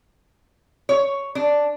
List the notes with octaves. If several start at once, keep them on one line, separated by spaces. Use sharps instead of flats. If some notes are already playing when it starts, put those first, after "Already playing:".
C#5
D4